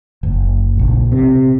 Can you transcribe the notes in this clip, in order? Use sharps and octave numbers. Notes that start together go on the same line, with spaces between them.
F#1
A#1
C3